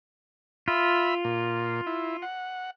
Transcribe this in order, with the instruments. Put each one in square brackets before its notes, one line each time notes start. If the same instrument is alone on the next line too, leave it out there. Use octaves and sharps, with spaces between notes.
[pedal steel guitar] F4 [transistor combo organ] E5 B5
[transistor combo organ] A#2
E4
F#5